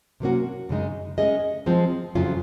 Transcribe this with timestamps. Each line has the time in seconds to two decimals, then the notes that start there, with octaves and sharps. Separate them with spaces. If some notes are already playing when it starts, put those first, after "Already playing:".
0.20 C3 F#3 A#3 C#4 F#4
0.69 F#2 C#3 G#3 D#4
1.18 G#3 C#4 G#4 D#5
1.66 F3 G#3 C4
2.15 F2 C#3 F#3 C#4 F4